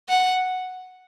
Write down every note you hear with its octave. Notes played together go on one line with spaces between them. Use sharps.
F#5